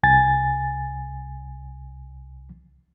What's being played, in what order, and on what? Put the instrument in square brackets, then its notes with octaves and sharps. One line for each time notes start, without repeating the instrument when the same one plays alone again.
[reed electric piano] C2 G#5 A6